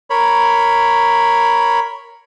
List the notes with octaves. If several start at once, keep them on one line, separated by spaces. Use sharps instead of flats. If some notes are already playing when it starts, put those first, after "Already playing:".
A#4 C#5 B5